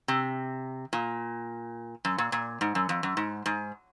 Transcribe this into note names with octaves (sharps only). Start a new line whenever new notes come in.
C3
A#2
F#2
A#2
A#2
G#2
F#2
F2
F#2
G#2
G#2